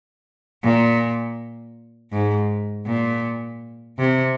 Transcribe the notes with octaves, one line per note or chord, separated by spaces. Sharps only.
A#2
G#2
A#2
C3